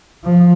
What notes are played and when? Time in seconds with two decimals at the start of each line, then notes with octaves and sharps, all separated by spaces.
0.24 F3